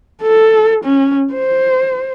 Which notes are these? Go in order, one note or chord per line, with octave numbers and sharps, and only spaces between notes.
A4
C#4
C5